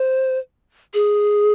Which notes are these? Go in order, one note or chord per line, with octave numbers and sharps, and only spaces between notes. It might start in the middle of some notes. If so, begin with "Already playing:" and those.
Already playing: C5
G#4